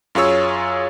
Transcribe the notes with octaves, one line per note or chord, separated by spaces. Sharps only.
F#2 F4 G#4 C#5 E6